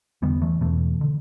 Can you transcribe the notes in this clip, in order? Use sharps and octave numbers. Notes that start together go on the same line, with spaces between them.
E2 D3 G3 B3
E3 A3
E2 B2 E3 A3
D3